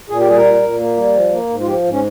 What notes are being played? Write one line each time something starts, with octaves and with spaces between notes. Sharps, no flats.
A#2 G#4
G4
G3 G#4
A#4
A#2
A#2
A#3
G3
F3
A#3
G#2
F4
F3 G4
G#2
C#4